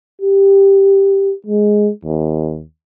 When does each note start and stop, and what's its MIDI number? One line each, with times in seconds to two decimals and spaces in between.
0.21 1.34 67
1.46 1.91 56
2.04 2.63 39